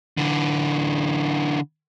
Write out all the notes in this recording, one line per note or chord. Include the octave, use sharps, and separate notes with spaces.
D3 E3